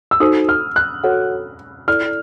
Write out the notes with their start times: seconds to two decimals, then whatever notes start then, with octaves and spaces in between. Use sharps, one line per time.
0.11 E6
0.20 D#4 F#4 A4 C5 D#6
0.49 F6
0.76 F#6
1.04 F#4 A4 C#5 F#5
1.88 E4 A4 D5 F6